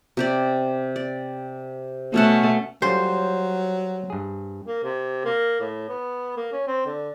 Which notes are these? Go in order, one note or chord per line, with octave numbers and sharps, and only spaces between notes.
C3 G4 D5
D5
B2 A3 C#4 F#5
F#3 G3 C#4 F4 C5
G2 G#4
A#3
C3
A#3
A2
B3
A#3
C#4
C4
D3